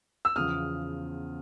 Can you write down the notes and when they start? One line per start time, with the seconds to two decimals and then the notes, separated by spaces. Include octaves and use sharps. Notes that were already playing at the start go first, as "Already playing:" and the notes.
0.25 E6
0.36 E2 C#3 F3 D#6 F6